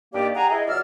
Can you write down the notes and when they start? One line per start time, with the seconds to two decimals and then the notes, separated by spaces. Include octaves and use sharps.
0.14 G2 D#3 A#3 G4 D5
0.35 G4 G#4 F#5 G#5 A#5
0.50 E4 G#4 D#5
0.68 C#2 F#3 D5 E6 F6